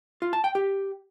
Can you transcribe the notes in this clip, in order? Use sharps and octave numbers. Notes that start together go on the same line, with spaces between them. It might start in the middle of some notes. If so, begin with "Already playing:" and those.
F4
A5
G5
G4